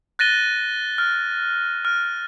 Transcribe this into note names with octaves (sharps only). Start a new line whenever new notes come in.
F#6 A6 A#6 D#7 G7
F6
F6